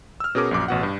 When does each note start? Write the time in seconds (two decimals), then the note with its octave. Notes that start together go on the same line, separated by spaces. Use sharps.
0.20 E6 F6
0.35 B2 C#4 G#4 A#4 D6
0.51 A#1 F#2 D6
0.68 A1 B2 F#5
0.83 G2